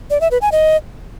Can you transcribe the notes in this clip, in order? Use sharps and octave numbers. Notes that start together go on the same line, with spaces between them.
D5
E5
B4
G#5
D#5